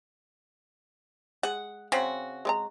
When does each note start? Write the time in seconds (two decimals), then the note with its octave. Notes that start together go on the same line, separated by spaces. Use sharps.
1.43 G#3 F#5
1.92 C#3 C4 F#4
2.45 G#3 D5 A#5